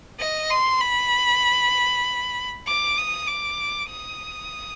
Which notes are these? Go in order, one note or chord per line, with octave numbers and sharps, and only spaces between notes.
D#5
C6
B5
D6
D#6
D6
D#6